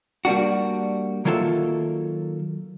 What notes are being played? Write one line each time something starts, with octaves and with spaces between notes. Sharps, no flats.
G3 A#3 D4 F#4
D#3 F#3 A#3 F4 A4 E5